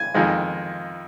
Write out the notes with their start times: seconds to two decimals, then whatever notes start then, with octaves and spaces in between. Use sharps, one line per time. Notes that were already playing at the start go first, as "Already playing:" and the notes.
Already playing: G#5
0.14 F2 D#3 G#3